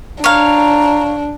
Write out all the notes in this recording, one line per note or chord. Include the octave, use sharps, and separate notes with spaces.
D4 C#5 F5 A#5